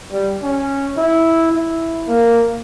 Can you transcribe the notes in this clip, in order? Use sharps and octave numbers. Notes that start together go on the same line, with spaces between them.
G3
C#4
E4
E4
A#3